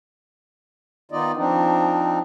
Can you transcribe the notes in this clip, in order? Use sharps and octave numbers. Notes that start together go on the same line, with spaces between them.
D#3 B3 D#4 F4 D5 D#5
F3 C4 D4 D#4